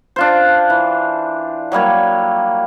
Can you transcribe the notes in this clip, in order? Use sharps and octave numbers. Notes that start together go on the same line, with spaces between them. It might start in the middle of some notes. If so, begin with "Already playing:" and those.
D4 F4 C5
E3
F#3 G3 A#3 C#5